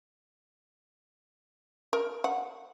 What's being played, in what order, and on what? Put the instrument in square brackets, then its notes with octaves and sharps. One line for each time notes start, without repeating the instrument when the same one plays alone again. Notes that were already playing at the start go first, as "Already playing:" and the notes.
[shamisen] A#4
F#5